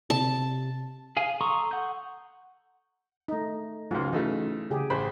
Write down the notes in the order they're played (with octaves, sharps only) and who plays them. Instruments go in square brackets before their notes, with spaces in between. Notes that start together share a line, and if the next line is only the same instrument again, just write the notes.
[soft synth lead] C3 [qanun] A5
[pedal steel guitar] G#4 F5 G#5
A4 A#5 C6 C#6 D#6
F#5 G6
[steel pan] A3 D#4
[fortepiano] C#2 G#2 [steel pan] F#3 F4
[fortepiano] C#3 A3 D#4 [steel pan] E3
[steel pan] C#3 G4 G#4
[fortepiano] A1 C5 B5